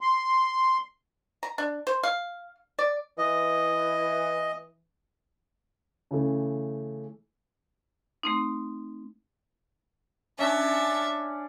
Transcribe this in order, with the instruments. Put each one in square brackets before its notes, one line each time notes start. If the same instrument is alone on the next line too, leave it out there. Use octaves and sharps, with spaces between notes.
[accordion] C6
[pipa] A#5
D4
C5
F5
D5
[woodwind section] E3 [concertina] D#5
[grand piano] C#3 E3 A3
[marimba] A3 C4 D#4
[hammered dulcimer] C#4 D4 [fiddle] E5 A5